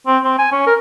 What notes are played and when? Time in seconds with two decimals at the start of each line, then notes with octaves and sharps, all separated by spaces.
0.07 C4
0.24 C4
0.39 G#5
0.52 C#4
0.67 A#4